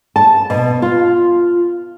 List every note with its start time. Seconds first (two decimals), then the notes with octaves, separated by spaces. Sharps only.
0.16 A5
0.50 B2
0.82 F4